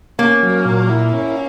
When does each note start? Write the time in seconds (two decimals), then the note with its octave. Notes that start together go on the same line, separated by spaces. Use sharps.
0.19 A#3 C#4
0.43 F#3
0.65 A#2
0.89 E4
1.13 C#4